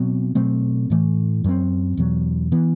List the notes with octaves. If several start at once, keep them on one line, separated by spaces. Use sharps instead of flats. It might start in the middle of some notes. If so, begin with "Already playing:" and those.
Already playing: B2 F#3 C4
B2 F#3 A3 C4
A2 E3 A3
F#2 F#3 C4
E2 B2 F#3
E3 B3